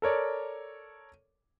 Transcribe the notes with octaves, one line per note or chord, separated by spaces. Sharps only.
A4 A#4 C#5 D5